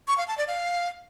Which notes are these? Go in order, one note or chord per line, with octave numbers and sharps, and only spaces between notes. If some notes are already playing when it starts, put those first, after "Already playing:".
C#6
F5
A5
D5
F5